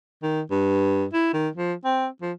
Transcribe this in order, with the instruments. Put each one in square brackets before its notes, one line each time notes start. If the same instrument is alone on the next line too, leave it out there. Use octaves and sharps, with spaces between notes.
[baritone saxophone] D#3
G2
E4
D#3
F3
C4
F3